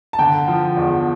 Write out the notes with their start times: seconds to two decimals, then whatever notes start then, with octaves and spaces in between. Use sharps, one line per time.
0.13 A5
0.19 D3 G5
0.48 F3
0.77 E2